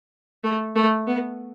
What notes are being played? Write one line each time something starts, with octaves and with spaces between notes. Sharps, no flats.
A3
A3
B3